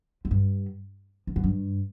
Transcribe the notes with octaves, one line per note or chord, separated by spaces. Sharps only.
F#2
G2
E2
F#2
G2